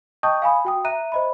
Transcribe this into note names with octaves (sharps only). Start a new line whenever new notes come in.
D#5 G5 A5 C#6 D#6 G6
F5 G#5 B5 D#6
F#4 G5 D#6
E5 A#5 F#6 D#7
C5 D#5 B5